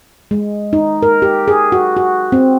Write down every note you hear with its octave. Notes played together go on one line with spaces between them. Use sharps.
G#3
D#4
A#4
G4
G#4
F#4
F#4
C4